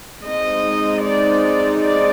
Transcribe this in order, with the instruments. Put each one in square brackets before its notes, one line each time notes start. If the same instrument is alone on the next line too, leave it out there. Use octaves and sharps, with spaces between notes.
[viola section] G#3 C4 D#4 D#5
D5
D5